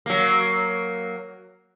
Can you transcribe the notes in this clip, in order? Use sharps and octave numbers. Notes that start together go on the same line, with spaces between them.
F#3 A#3